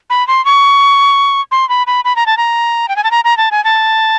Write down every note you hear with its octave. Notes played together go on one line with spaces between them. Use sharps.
B5
C6
C#6
C6
B5
B5
B5
A#5
A5
A#5
G5
G#5
A5
A#5
A#5
A5
G#5
A5